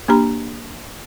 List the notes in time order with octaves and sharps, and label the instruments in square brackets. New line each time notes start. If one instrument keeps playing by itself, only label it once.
[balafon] A#3 D4 G4 A#5